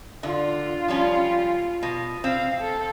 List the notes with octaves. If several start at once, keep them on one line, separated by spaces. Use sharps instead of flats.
D3 F4
F3 G3 C#4
B2
C4 F5
A4